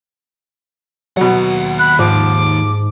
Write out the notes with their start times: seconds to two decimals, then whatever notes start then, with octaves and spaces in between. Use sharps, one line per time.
1.17 D#2 B2 F#3 F#5
1.79 B5 F#6
1.99 G#2 F3 D6